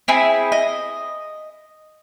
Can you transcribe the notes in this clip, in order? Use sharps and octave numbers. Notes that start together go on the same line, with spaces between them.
C4 E4 G#4
D#5